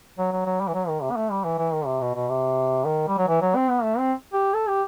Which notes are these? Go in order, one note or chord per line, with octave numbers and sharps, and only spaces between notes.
F#3
F#3
F#3
G3
E3
F#3
D#3
C3
B3
A3
G3
E3
E3
D#3
C3
B2
B2
C3
D#3
G3
F#3
E3
F#3
C4
B3
A3
C4
G4
A4
G4